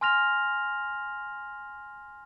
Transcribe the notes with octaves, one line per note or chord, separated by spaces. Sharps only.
G#5 C6 F6 A#6 F7